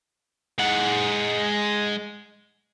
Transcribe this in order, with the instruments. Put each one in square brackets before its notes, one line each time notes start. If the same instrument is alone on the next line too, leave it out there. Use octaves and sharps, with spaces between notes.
[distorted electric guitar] G#3 F#5